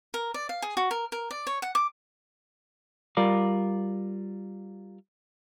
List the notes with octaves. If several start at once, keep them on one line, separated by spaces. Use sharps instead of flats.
A#4
D5
F5
G#4
F#4
A#4
A#4
D5
C#5
F#5
D6
G3 F4 A#4 D5